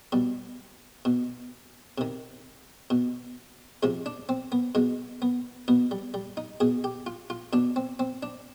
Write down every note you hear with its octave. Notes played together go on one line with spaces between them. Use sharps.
B2 G3
B2
C3 D#3
B2
C3 F3 G#3
D4
C4
B3
B2 G#3
B3
B2 B3
G3
G3
D#4
B2 G#4
G4
F4
F4
B2 D4
C4
C4
D4